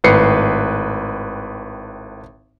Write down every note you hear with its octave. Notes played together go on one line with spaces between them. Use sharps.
G#1 A2 B4 C7 C#7